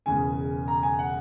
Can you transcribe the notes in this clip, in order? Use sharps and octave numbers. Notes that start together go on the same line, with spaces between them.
E1 E2 C#3 G#5
A#5
G#5
F#5